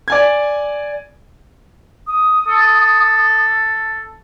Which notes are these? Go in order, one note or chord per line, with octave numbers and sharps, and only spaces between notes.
D5 G#5 G#6
D#6
A4